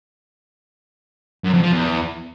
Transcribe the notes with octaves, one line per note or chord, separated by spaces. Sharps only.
F#2
F2
F3
E2